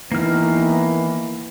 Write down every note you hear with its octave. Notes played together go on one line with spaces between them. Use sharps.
D#3 E3 A#3 B3 F6